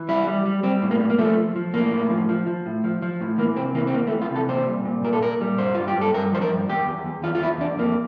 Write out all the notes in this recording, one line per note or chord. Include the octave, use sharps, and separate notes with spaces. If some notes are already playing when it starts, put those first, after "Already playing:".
Already playing: E3
G3 E4
G3
G3
G3 C4
A2
A#3
G3
A#3
F3 A3
F3
F3
A2 A#3
A2
F3
F3
F3
A2
F3
F3
A2
E3 A#3
C3 C4
E3 A#3
C4
E2 A#3
A3
E3
F4
C3
A4
A#2 C5
G3
A#2
A#2 A#4
A4
A#2 A#4
G3
G2 C5
G2 F4
G4
G2
A4
G2 A#4
F3 C5
A#4
G2
E2 G4
E2
E2
E2 F4
F4
E2 E4
E2 D4
F2 A#3